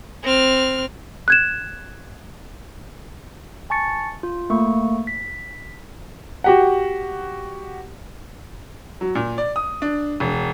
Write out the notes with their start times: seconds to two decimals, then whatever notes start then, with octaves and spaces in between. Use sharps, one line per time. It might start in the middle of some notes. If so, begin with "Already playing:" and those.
0.23 C4 F6
1.28 F#6 G#6 E7
3.70 G#5 A5 C#6 A6 C#7
4.23 F4
4.50 A3 A#3 C#6
5.07 B6
6.44 F#4 G4 F#5
9.01 F#3
9.15 A#2
9.38 D5
9.56 D#6
9.82 D4
10.20 E1